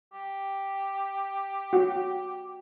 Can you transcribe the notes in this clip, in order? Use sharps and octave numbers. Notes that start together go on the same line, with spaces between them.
G4
F#4